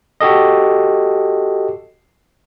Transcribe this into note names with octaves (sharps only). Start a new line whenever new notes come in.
F#4 G4 A4 D#5